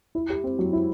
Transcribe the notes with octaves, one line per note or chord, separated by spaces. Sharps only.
E4
G4
C4
F#3
E4